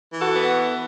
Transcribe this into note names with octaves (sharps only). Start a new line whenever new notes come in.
E3
F#4 A4
B3